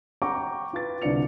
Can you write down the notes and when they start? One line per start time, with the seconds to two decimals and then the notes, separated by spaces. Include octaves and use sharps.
0.22 F#5 G5 A#5 C#6 D6
0.73 F4 B4 A6
1.02 C2 D3 D4 D5 C#7 F7